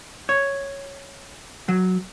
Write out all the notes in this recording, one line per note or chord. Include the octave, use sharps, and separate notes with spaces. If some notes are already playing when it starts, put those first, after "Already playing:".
C#5
F#3